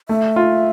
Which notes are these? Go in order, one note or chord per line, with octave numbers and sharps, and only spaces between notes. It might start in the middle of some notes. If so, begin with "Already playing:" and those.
A3 E5
F4